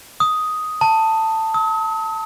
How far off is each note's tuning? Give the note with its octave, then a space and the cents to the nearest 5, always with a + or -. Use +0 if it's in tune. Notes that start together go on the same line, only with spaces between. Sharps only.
D#6 +5
A5 +15
D#6 +45